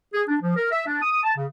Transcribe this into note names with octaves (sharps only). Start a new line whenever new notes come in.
G#4
D4
F3
A#4
E5
D4
D#6
A5
C#3